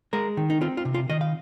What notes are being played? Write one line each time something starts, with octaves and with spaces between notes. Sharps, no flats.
G#3 A#4
D#3
D#4
C4 F4
F4
C3
F4
D#3 D#5
F5